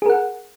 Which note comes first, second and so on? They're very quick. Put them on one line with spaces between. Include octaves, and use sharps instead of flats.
G#4 A#4 F#5